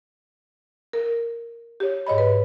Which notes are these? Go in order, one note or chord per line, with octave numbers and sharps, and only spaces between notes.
A#4
G4 C#5
G#2 C#5 D#5 B5
B4